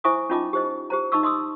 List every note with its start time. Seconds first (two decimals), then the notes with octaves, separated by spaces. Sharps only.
0.04 E4 C5 E5 G#5 C#6 D#6
0.30 C#4 D#4 F4 D#5 A5 D6
0.53 G4 C5 D#5
0.90 G4 C5 A#5
1.12 D#4 D#5 A5 C#6 E6
1.23 D#5 C6 D#6 E6